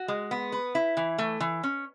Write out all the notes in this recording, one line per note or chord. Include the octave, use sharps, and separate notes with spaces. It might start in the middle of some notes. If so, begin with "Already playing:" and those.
Already playing: F#4
G#3
B3
B4
E4
E3
A3
E3
C#4